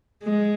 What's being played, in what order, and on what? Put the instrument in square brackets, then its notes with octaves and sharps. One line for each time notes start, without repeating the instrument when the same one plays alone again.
[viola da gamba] G#3